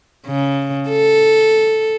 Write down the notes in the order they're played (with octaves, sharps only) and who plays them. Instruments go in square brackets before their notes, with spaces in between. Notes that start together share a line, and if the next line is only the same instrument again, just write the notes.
[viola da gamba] C#3
A4